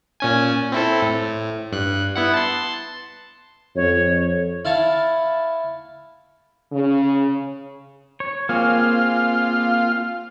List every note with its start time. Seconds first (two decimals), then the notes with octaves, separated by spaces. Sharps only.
0.20 A#2 C#4 G#5
0.72 C4 E4 A4
1.02 A2
1.72 G2 F#6
2.15 B3 E4 F#5
2.34 A5 C6
3.76 F2 C#5
4.65 E4 F5 A5 C#6
6.72 C#3
8.20 C#5
8.49 A#3 C4 F4 G#4